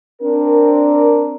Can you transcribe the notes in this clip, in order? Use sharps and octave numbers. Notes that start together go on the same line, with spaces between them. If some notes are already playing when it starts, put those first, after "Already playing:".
C4 D4 A#4